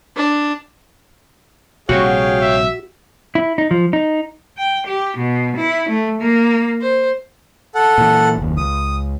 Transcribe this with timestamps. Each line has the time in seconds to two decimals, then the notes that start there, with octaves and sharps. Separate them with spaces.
0.16 D4
1.89 A#1 C3 G3 F#4 G#4 C#5 F5 G5
2.41 E5
3.35 E4
3.58 D#4
3.71 F3
3.93 D#4
4.57 G5
4.85 G4
5.16 B2
5.56 E4
5.88 A3
6.19 A#3
6.82 C5
7.75 A4 F#5
7.98 A#2 E3
8.37 F#1 D#2
8.57 C#2 D#6